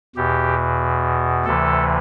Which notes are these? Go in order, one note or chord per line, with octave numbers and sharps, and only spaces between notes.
E2 B2 G4
D2 C3 E3 A4